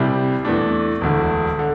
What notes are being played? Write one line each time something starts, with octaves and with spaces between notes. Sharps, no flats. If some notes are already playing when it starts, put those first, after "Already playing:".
Already playing: C2 C3 G3 E4
E2 E3 A3 D4
E1 D2 D3
D3